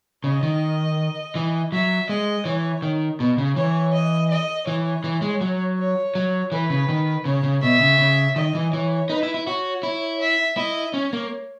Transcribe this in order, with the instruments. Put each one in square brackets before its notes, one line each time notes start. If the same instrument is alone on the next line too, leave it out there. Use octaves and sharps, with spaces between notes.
[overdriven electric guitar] C#3 [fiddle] D#5
[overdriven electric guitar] D#3
E3
[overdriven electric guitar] F#3 [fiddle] E5
[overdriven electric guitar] G#3 [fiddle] D#5
[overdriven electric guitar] E3 [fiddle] C#5
[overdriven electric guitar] D#3
B2
C#3
[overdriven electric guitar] E3 [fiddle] C#5
[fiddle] D#5
D#5
[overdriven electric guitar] E3 [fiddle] C#5
[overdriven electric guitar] E3
G#3
F#3
[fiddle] C#5
[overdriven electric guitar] F#3
[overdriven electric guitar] E3 [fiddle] B4
[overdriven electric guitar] C#3
D#3
[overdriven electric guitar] C#3 [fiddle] C#5
[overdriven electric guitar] C#3
[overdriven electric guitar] B2 [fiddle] E5
[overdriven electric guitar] C#3
C#3
[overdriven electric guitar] D#3 [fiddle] D#5
[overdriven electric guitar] E3
[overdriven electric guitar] E3 [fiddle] C#5
[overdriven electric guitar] D#4 [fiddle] B4
[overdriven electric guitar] E4
E4
[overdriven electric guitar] F#4 [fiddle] C#5
[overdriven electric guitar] E4
[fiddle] E5
[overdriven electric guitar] E4 [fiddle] D#5
[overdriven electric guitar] C#4 [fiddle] C#5
[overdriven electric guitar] A#3